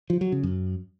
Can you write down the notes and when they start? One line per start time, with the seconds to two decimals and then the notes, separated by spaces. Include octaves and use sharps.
0.10 F3
0.21 F#3
0.32 C#3
0.43 F#2